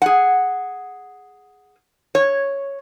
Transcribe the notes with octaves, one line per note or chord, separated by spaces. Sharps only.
G#4 F#5
C#5